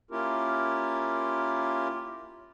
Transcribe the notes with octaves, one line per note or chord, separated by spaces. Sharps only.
A#3 C#4 E4 F4 G4 A#4